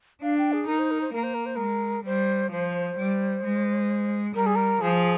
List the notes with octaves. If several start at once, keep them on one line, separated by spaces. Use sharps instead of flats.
D4 F5
G5
G#4
D#4 A#4
C5
A#4
C5
A#3 A#4
C5
A#4
C5
G#3 A#4
G3 C5
F3 C5
G3
G#3
G3 A#4
G#4
A#4
F3 G#4